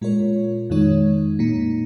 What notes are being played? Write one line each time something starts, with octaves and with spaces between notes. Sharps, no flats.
A#2 G#3 F4 A#4 C#5
F2 D#3 G#3 D#4 C#5
A#2 A#3 D#4